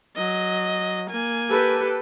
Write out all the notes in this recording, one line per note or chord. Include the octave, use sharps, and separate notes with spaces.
F#3 D#5
A#3 G#5
G4 A4 B4